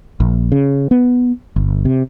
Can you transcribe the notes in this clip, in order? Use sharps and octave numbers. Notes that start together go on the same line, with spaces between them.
A#1
C#3
B3
G1
C3